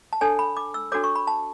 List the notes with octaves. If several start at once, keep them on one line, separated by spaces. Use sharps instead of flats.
A5
D4 A4 C#5 G#5
B5
D6
E6
D4 F#4 A4 C#5 D6
C#6
B5
A5